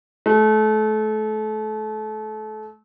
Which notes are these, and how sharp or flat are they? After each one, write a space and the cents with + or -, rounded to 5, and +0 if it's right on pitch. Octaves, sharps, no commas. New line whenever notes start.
A3 -30